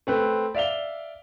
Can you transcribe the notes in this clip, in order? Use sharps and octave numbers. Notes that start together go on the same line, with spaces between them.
A3 C4 B4
D5 E5 F5 F7 G7